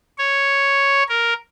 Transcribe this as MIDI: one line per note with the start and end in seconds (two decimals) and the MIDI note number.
0.18 1.03 73
1.09 1.34 70